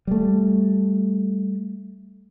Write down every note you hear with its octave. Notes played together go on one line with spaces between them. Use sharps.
G3 A3